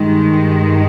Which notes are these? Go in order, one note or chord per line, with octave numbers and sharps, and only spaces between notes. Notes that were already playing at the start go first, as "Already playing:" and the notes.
Already playing: G2 D#3 G#3